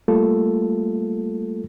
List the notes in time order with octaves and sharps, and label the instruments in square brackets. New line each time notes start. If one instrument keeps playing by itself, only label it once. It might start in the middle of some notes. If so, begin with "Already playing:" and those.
[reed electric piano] G3 A3 A#3 F4 A4